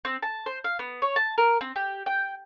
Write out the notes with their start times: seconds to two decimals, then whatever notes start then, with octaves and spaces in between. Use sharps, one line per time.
0.05 C4
0.22 A5
0.46 C5
0.64 F5
0.79 B3
1.02 C#5
1.16 A5
1.38 A#4
1.61 C4
1.76 G4
2.06 G5